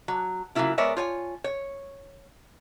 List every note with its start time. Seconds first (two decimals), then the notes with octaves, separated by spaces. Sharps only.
0.08 F#3
0.55 C#3 F#3 G#3 A#3 E4 F4
0.78 G#3 B3 A#4 C#5 D5 E5
0.97 F4 C#5 G#5
1.44 C#5